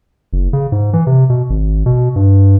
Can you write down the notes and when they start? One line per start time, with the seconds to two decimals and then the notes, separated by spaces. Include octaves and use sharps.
0.33 F#1
0.53 C#3
0.72 G#2
0.93 E3
1.07 C3
1.30 B2
1.50 G#1
1.86 B2
2.16 G2